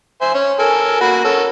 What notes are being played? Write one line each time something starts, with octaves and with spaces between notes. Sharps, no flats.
C5 E5 G#5
C#4 C#5
A4 A#4 G#5
A#3 F#4 B5
C#4 A4 A#4